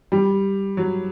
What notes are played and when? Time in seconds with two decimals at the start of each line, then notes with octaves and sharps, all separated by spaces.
0.12 G3
0.77 F#3